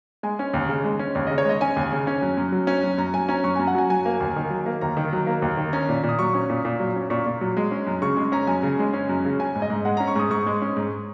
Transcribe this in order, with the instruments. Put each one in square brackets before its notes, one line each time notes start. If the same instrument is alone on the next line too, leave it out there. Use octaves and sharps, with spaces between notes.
[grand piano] G#3 G#5
C#4
D#2
C#3
G#3
C#4
D#2 C#5
C#3 D#5
C#5
G#3 D#5
C#4 G#5
D#2
C#3
C#4
F#2
F#2
F#3
C#4
F#2
F#2 A#5
F#3 G#5
C#4 A#5
F#2 C#6
F#2 G#5
F#5
F#3 G#5
F#3 G#5
A#3
D#2
D#3
F#3
A#3
D#2 A#5
D#3
F#3
A#3
D#2
D#3
C#4 A#5
A#2
A#2
D#6
F#3 C#6
C#4
A#2
A#2
F#3
C#4
A#2 C#6
A#2
F#3
G#3
C#4
F#2
C#3 C#6
G#3 C#6
C#4 A#5
F#2 G#5
C#3
G#3
C#4
F#2
C#3
C#4 G#5
G#2
D#5
G#2
G#3 F#5
C#4 A#5
C#6
G#2 D#6
G#2 C#6
G#3
C#4
G#2